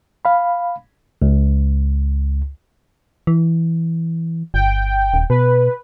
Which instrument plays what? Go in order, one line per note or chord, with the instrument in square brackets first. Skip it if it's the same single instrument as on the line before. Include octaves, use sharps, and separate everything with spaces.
[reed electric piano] F5 B5
[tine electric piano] C#2
[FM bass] E3
[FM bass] G1 [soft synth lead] G5
[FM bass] D#1
[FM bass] B2 [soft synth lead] B4